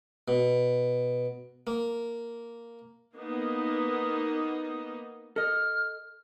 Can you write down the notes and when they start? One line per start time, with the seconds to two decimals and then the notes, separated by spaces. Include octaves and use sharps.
0.28 B2
1.67 A#3
3.16 A#3 B3 D#4
5.36 A4 D#5 F6